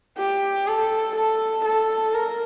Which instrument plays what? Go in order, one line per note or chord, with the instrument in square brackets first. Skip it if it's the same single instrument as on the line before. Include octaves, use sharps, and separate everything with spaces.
[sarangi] G4
A4
A4
A4
A#4